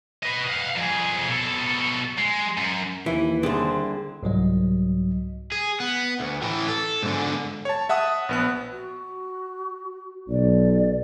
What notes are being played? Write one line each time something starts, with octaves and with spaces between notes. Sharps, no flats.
B4 D#5
F5 F#5
F2 G#4
B2 A4
G#3
F#2
D#2 E3
C2 D3 C4 G#4 A5
C2 G#2 F#3 D#5
G#4
B3
D2
A2 E3
A4
G#2 D3
C#5 A5
E5 F#5 A5 D#6
A#1 B3 F#6
F#4
B1 D5